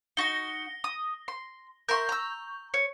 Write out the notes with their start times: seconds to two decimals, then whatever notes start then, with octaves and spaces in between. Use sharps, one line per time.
0.17 D#4 F#4 A#6 G7
0.84 D#6
1.28 C6
1.89 A#4 E5 C6 C#6 G6
2.09 A#5 E6
2.74 C#5